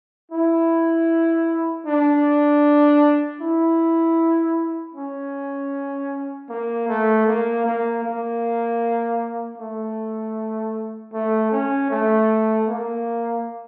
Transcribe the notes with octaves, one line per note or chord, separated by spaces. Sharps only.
E4
D4
E4
C#4
A#3
A3
A#3
A#3
A#3
A3
A3
C#4
A3
A#3